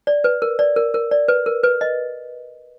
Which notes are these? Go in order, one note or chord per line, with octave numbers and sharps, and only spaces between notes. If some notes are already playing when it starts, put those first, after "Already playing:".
D5
B4
A#4
D5
A#4
A#4
D5
B4
A#4
B4
D#5